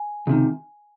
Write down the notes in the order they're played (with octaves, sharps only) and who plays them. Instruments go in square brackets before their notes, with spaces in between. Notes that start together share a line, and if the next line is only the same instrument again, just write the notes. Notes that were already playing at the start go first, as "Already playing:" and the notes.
Already playing: [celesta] G#5
[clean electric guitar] C#2 C3 D#3